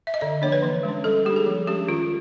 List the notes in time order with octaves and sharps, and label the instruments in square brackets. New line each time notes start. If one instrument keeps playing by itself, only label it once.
[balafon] E5
D#5
D3 D5
F3 A#3 D4 C#5
B4
E3
G#3
C#4
G3 A4
A#3 D4 G4
G#4
F3
G#3 C#4 G4
D#3 F4